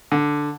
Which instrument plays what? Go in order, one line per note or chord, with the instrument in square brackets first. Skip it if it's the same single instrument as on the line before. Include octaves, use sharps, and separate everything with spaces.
[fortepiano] D3